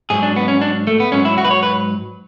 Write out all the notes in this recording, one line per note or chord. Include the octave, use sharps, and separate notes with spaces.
G#2 F#3 G#4
D4
B3
C#4
D4
A3
B3
G#2 F#3 C#4
E4
F#4
B4
C#5
B4